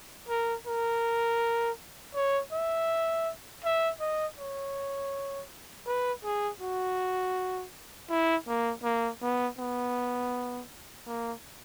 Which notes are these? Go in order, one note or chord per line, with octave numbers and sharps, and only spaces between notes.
A#4
A#4
C#5
E5
E5
D#5
C#5
B4
G#4
F#4
E4
A#3
A#3
B3
B3
A#3